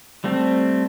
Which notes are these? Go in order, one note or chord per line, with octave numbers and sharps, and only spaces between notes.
G3 A3 C4